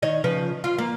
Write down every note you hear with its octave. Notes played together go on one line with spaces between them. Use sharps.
D#3 C#5 D#5
C#3 F3 B4
F4
A#3